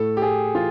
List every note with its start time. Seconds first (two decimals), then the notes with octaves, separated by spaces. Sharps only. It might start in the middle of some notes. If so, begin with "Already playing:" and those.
Already playing: A2 A4
0.17 G4
0.22 A2 G#4
0.54 E3 F4